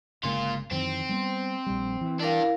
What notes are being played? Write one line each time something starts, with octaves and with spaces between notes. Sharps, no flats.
G1 C#3 G#3 A#3 F4
F#2 D#3 E3 C4
G3 A#3 B3
A#1 G3
E3
D4 E4 G4 A#4 F5